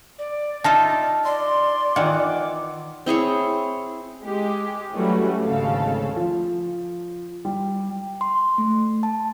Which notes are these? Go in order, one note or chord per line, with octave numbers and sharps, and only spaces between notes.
D5
D#4 F4 A4 E5 A5
D5 C6
D#3 E3 F4 F#5 D6
C4 E4 G#4 C#5
G#3 G4
E3 F#3 G3 A3 C#4 F#4
G#1 D2 C#3 A4 F5
F3
G3
C6
A3
A5